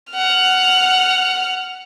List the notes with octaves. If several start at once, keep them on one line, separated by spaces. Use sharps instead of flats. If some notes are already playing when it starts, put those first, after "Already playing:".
F#5 F6